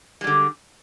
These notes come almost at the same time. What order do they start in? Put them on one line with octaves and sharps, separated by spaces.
G#3 G3 D3